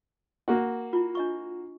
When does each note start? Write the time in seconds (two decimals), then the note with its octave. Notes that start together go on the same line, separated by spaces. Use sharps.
0.48 A#3 F#4
0.93 E4 F4
1.15 D4 D#5 C#6